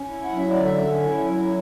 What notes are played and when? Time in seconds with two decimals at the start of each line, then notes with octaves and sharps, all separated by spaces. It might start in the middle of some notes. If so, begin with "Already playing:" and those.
Already playing: C#4
0.08 E4
0.24 F#5
0.32 F#3
0.38 E5
0.50 D3 D5
0.64 E5
0.78 C#4
1.01 E4
1.25 F#3